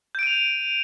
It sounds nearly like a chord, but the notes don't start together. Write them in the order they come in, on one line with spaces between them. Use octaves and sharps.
G6 D7 D#7 F7